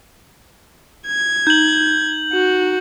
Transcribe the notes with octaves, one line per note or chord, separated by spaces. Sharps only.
G#6
D#4 G6 F#7
F#4